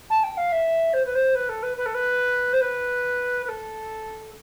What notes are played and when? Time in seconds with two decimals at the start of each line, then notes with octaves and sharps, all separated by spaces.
0.10 A5
0.23 G5
0.37 F5
0.52 E5
0.93 C5
1.05 B4
1.15 C5
1.35 B4
1.49 A4
1.63 B4
1.77 B4
1.86 A4
1.94 B4
2.53 C5
2.61 B4
3.44 B4
3.48 A4